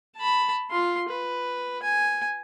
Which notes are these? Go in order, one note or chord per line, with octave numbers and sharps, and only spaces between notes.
A5 B5
F4 C6
B4
G#5